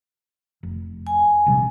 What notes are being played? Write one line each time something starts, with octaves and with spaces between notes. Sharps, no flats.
F1
G#5
A#1 C3 G3